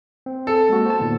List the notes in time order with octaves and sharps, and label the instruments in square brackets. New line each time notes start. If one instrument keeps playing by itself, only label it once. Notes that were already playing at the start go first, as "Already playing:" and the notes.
[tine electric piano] C4
[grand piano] A4
[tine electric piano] G#3 A#3 F#4
C5 A5
A#2 D#3 B3